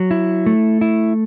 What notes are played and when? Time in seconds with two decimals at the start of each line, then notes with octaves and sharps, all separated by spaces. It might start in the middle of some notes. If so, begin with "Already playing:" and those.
Already playing: F#3
0.11 E4
0.46 A3
0.81 E4